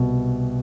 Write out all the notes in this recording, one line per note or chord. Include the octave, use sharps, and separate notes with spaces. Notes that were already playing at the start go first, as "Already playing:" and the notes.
Already playing: C2 B2